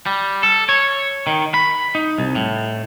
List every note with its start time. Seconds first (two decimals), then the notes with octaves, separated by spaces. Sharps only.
0.06 G3
0.43 A4
0.69 C#5
1.27 D#3
1.54 B5
1.95 D#4
2.18 C2
2.35 A2